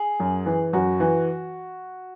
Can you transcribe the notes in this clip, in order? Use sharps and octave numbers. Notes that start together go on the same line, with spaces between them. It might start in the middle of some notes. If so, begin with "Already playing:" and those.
Already playing: G#4
F#2
E3
F#2 F#4
E3